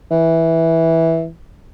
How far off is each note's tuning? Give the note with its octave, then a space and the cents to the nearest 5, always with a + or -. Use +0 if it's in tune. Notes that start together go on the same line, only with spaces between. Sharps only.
E3 -10